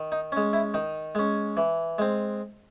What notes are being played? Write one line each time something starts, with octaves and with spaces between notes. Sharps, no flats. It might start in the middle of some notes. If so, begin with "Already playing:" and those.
Already playing: D#3
D#4
G#3 C#4
E4
D#3 D#4
G#3 C#4
E3
G#3 C4